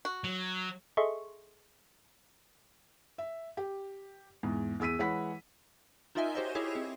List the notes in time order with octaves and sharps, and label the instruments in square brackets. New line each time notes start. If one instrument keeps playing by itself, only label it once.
[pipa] F#4
[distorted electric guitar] F#3
[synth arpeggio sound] G#4 A4 D#5 E5 C6 C#6
[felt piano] E5
G4
E2 G#2
E2 G#4 E6 B6 D#7
E3 G#3 C#5 F#5 B5 B6
[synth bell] D#4 F4 A#4 D#5 E5 G#5
F#4 G4 C5 C#5 D#5
E4 G4 G#4 C#5 E5
C4 G#4